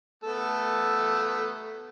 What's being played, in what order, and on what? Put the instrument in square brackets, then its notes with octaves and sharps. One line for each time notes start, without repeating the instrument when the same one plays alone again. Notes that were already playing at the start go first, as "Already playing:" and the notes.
[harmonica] A3 B3 A4